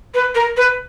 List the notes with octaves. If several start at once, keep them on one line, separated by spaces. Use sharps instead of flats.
B4
A#4
B4